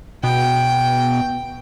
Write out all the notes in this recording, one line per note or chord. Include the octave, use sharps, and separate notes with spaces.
B2 G5